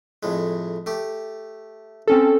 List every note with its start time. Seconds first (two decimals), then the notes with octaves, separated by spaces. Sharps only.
0.23 F2 A2 G#3
0.86 A3 G4
2.08 C4 C#4 A4